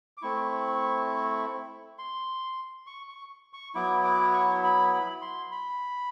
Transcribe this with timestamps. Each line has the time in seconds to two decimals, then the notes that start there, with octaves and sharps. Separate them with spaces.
0.17 D6
0.22 A3 C4 E4 C#6
1.98 C6
2.87 C#6
3.09 C#6
3.53 C#6
3.75 F#3 B3 E4 D6
4.04 D6
4.34 C#6
4.64 B5
4.93 B5
5.22 C6
5.52 B5